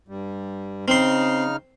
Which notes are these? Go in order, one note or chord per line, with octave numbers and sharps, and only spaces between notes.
G2 G3
C#3 C4 D#4 C6 F6